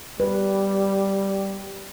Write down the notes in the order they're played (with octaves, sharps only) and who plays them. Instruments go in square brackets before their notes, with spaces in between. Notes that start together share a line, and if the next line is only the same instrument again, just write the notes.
[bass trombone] G3 [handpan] B4